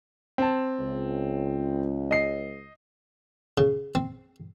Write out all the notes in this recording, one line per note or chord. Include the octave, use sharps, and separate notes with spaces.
C4 A5
C#2
D#5 C7
C#3
C4